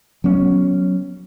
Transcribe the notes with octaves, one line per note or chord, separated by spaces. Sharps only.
F#3 B3 C#4